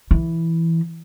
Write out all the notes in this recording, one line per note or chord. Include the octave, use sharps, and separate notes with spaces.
E3